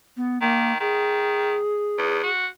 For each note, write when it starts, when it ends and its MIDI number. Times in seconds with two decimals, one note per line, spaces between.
0.17 0.38 59
0.42 0.79 51
0.42 0.73 58
0.80 1.56 51
0.80 2.29 68
1.98 2.19 40
2.24 2.46 66